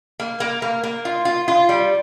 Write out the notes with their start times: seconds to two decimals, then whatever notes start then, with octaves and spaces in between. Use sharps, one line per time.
0.20 A#3
0.40 A#3
0.62 A#3
0.83 A#3
1.05 F4
1.25 F4
1.48 F4
1.69 G3